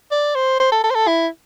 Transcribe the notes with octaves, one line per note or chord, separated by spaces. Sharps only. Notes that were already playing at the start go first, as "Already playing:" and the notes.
D5
C5
C5
A4
A4
C5
A4
E4